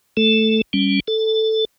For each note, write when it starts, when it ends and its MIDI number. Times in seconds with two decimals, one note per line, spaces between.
0.17 0.61 57
0.17 0.61 69
0.73 1.00 55
0.73 1.00 61
1.08 1.65 69